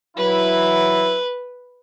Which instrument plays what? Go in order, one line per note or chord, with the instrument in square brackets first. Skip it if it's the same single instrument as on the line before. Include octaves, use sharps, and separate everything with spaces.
[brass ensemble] F#3 E4 [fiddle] B4